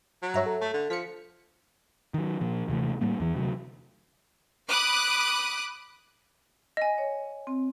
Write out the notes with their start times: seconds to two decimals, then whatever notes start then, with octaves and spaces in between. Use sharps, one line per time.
0.23 F#3
0.34 G2 C#5 E5 A#5
0.46 A4
0.61 A3
0.74 D3
0.90 F3 B6 C#7
2.14 D#3 F#3
2.41 A#2 F3
2.68 D#2 C3 E3 A3
3.01 A2 G3 A#3
3.20 E2 E3
3.35 D2 C3 F#3
4.69 B5 D6 D#6 F#6
6.77 D#5 G#5
6.98 C#5
7.47 C4